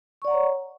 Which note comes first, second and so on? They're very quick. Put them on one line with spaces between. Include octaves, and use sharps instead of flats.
C#6 D5 F#5 A#5 C#5